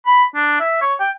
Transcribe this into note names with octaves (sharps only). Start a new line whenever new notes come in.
B5
D4
E5
C#5
G5